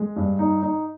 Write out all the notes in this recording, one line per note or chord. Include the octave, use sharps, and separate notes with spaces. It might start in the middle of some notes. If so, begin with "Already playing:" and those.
Already playing: G#3
G2
D#4
D#4